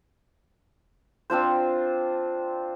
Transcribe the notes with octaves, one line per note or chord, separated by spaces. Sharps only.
C4 D4 F4 C5